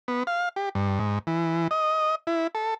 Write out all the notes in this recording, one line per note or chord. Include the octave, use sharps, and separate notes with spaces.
B3
F5
G4
G2
G#2
E3
D#5
E4
A4